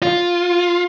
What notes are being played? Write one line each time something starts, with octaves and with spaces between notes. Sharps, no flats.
F4